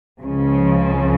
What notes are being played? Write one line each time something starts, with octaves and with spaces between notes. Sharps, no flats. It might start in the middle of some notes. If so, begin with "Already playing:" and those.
C#2 C#3 F3